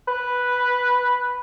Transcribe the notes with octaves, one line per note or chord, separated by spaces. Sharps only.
B4